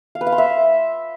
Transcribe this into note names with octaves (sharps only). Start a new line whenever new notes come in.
F5
B4
F5
C6
E5